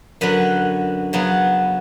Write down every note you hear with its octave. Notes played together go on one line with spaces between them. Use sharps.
F#2 D3 F#3 B4
C#3 F#3 B3